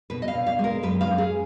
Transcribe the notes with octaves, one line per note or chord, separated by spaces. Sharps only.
B2 B4
D#5
F5
B2
F5
G#3
A#4
F#2 B4
F5
C#4
G#4